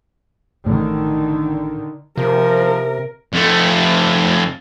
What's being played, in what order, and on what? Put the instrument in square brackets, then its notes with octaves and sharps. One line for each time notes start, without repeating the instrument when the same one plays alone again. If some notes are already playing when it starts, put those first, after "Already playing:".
[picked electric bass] A1 A2 [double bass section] D3 D#3
[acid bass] C3 [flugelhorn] F3 [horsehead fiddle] A#4
[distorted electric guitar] F2 A3